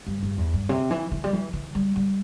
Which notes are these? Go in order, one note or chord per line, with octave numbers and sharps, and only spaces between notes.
G2
G2
E2
G2
C3
E3
E3
G3
E3
E3
G3
G3